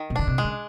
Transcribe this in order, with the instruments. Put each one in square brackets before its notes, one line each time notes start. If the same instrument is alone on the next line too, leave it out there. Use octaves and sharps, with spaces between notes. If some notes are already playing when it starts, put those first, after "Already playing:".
Already playing: [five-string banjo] D#3
[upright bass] B2
[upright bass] C#3 [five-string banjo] D4
[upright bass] C3
[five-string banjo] G#3
[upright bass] C#3